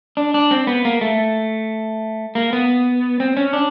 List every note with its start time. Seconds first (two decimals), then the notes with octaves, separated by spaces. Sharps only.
0.17 D4
0.34 D4
0.51 C4
0.67 B3
0.85 A#3
1.01 A3
2.35 A#3
2.53 B3
3.20 C4
3.37 C#4
3.53 D4